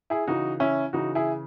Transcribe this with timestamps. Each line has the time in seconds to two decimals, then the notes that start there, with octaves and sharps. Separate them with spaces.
0.10 E4 G#4
0.27 C#3 E3 D#4 F#4
0.60 C#4 E4
0.93 C#3 E3 D#4 F#4
1.15 E4 G#4